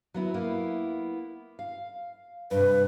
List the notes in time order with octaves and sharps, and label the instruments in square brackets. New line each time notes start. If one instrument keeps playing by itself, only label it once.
[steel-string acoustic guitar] F#3 B3 E4
A#3 B3 E4
F5
[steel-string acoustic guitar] G2 C3 [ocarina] B4